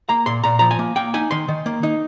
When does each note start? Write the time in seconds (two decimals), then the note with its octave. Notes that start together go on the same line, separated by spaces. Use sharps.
0.09 A#3 A#5
0.26 A#2 C6
0.44 A#2 A#5
0.59 F3 A#5
0.71 G#5
0.79 A#3
0.96 A#3 G5
1.14 D#4 G#5
1.31 D#3 C6
1.48 D#3
1.66 A#3
1.83 D#4